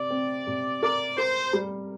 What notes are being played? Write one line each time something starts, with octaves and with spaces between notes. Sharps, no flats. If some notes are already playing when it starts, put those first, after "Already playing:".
Already playing: C3 D5
C4
C3
A#4 D5
A#4 C5
G3